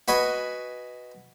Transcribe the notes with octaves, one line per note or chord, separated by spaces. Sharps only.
F#4 B4 D#5 G#5